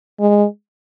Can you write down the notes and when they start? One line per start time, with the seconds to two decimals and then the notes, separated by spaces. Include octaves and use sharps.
0.20 G#3